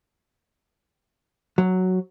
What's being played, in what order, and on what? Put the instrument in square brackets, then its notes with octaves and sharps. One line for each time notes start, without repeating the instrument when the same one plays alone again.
[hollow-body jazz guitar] F#3